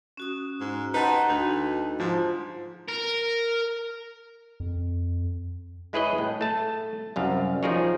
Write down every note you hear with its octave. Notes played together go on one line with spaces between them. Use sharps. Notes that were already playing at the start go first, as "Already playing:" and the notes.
C#4 F#4 D#6
G#2
D#4 G4 B4 D#5 F#5 A5 C6
D2 D4 D#4 F#4
G#2 F3
A#4
F2
G#3 E4 G#4 B4 C#5 D#5
A2
A3 A5
C2 F#2 F5
F3 D#4 F4 G#4 A#4 C#5